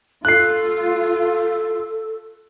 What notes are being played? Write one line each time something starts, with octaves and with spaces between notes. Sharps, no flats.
F4 A4 F#6 C7